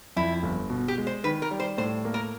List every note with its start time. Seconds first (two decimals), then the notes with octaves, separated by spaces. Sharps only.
0.16 F2 E4
0.43 G1
0.70 B2
0.88 G4
0.98 G#3
1.07 C5
1.24 D#3 B4
1.42 A#4
1.51 G3
1.60 C5
1.78 A2 C5
2.05 A#3
2.14 A#4